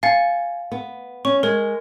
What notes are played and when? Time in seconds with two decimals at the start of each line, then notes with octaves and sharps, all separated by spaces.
0.03 F5 G#5 A6 C#7
0.72 B3
1.25 C#4 C#6
1.43 G#3 A#4 G#6